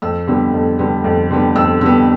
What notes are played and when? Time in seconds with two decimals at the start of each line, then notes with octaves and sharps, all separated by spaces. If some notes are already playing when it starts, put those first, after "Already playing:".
0.02 F2 E6
0.27 D3 G3 B3
0.53 F2
0.79 D3 G3 B3
1.04 F2
1.31 D3 G3 B3
1.56 F2 E6
1.81 D3 G3 B3 E6